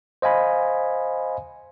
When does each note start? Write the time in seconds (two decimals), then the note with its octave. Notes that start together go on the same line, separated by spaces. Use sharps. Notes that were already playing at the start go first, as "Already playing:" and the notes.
0.22 C5 D#5 F5 G#5 B5